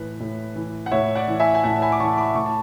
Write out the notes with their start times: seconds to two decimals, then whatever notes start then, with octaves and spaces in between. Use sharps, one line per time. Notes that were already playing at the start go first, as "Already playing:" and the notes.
Already playing: A2 E3 B4
0.20 A2
0.56 E3
0.86 F#5
0.92 A2 C#5 E5
1.15 D5 F#5
1.28 E3
1.40 E5 G#5
1.55 G#5
1.64 A2 F#5 A5
1.82 G#5 B5
1.92 D6
2.00 E3 A5 C#6
2.18 B5 D6
2.35 A2 A5 C#6
2.46 A5